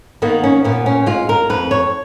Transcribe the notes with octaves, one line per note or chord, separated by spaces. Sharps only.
D#3 A#3 B3
C#4
A#2 B3
C#4
G#3 F4
A#4
F2 B4
C#5